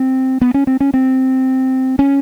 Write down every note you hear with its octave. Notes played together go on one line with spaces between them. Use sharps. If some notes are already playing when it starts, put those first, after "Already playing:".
Already playing: C4
B3
C#4
C4
C#4
C4
C#4